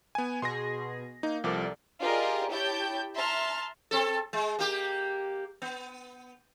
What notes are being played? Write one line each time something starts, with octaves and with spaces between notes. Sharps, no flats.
B3 G#5
B2 G#4 C6 A#6
A#3 D#4
C2 F3 A4 A#4 D5 D6
F4 G4 G#4 A#4 D5 D#5
E4 G4 C#5 G5 A5 G6
E5 A5 A#5 C6 F6
C4 A4
G#3
A#3 G4
B3